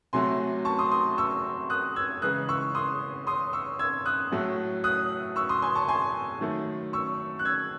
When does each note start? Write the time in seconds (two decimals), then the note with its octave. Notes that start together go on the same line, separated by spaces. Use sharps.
0.13 C3 F#3 A3 G#5 C6
0.65 A5 C#6
0.79 C6 D#6
0.91 C6 D#6
1.18 C#6 E6
1.70 D#6 F#6
1.96 E6 G#6
2.22 C#3 E3 G#3 D#6 F#6
2.49 C#6 E6
2.75 C6 D#6
3.27 C6 D#6
3.53 C#6 E6
3.79 E6 G#6
4.06 D#6 F#6
4.32 A2 F#3 A3
4.84 D#6 F#6
5.36 C#6 E6
5.49 C6 D#6
5.62 G#5 C6
5.75 A5 C#6
5.88 G#5 C6
6.41 D#3 F#3 A3
6.93 C#6 E6
7.39 F#6
7.45 E6 G#6